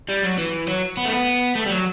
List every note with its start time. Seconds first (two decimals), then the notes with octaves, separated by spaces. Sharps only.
0.09 G3
0.23 F#3
0.38 E3
0.68 F#3
0.97 B3
1.05 A3
1.12 B3
1.56 A3
1.66 G3
1.71 F#3